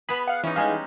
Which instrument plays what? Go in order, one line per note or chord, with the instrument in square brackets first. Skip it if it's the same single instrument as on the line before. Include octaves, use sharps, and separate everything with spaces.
[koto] B3 G#4 [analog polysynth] B5
[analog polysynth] F5 F#5
[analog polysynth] E3 [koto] C#4 D#4
[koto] G3 G#3 [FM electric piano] D#4 G#4 F5